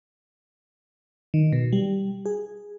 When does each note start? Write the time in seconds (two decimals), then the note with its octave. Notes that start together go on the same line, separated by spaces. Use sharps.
1.34 D#3
1.53 B2
1.73 G3
2.26 G#4